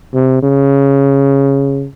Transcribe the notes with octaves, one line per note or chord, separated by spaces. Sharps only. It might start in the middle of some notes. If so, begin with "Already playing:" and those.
C3
C#3